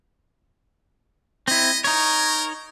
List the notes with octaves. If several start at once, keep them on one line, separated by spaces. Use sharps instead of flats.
C4 E4 D#5
D#4 A#4 C#5